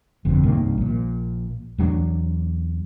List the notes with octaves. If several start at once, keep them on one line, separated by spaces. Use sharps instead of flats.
G1 F2 D3
C2 G2 D#3 A#3
A#1 A#2
E2 F#3 B3 D4